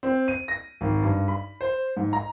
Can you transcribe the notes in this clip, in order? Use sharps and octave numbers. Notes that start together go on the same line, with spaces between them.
C4
D#7
A#6
G#1
G2
B5
C5
G#2
A#5